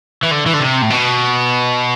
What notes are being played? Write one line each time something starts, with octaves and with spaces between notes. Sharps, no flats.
E3
D3
E3
D3
C3
A2
B2